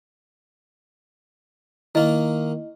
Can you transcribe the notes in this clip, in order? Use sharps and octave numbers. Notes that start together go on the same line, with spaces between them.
D#3 A#3 E4 D#5